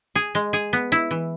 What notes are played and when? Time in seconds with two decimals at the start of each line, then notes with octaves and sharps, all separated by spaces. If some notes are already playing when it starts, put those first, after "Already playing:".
0.16 G#4
0.35 G#3
0.53 G#4
0.73 B3
0.92 E4
1.11 E3